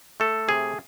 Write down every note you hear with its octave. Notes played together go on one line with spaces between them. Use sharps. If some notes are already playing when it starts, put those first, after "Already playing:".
A3 A4
C3 G#4